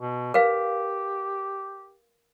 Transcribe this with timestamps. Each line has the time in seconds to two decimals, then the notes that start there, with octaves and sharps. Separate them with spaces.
0.01 B2
0.34 G4 A#4 B4 F5